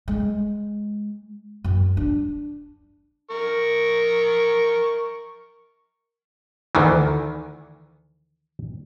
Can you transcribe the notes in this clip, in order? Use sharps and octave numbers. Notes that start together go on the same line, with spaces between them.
G#3
F#2
D4
A#4 C#6
D2 D#3 E3